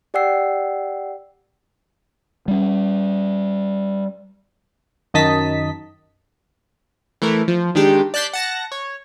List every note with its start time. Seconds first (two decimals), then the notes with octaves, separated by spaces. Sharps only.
0.14 G4 D5 F#5 G5 E6 C7
2.48 G3 C#4
5.14 F#2 D#3 D#5 A5 B6
7.22 E3 A3 A#4
7.48 F3
7.75 D#3 G#3 D4 G4
8.14 D5 A5 F#6 G6 B6 C7
8.33 F#5 A5 A#6
8.72 C#5